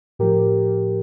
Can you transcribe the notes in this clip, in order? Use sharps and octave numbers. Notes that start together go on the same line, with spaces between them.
A2 F3 G4 A#4